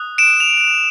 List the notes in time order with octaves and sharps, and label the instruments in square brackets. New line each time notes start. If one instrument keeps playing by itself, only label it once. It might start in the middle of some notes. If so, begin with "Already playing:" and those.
Already playing: [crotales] D#6 F#6
D7 E7
F7